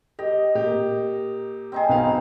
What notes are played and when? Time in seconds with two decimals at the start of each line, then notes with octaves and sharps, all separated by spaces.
0.19 G4 D#5
0.55 A#2 G4
1.72 C4 D#4 G#4
1.89 B1 B4 F5